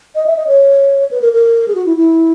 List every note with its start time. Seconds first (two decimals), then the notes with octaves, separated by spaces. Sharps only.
0.15 D#5
0.26 E5
0.36 D#5
0.47 C#5
1.11 B4
1.21 A#4
1.33 A#4
1.68 G#4
1.75 F#4
1.86 E4
1.97 E4